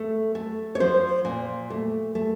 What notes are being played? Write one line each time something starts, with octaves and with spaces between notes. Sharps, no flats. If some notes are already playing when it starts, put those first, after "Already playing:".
Already playing: A3
A3
C#5
F3 C5
A#2
A3
A3